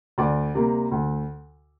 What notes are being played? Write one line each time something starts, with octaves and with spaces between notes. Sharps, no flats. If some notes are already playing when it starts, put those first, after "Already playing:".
D2 D5
C3 G3 A#3
D2